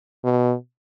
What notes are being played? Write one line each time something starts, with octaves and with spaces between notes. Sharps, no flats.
B2